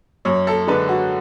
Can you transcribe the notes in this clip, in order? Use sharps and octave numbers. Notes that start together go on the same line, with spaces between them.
F#2 C#5
A4
D3 G#3 D4 B4
F#4